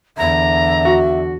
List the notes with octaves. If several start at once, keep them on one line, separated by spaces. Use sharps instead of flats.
E2 D3 E5 A#5
F#4